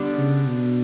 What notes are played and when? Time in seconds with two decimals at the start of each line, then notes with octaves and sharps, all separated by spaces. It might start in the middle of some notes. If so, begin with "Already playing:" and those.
Already playing: D3 G3 B3 D4
0.18 C#3
0.47 B2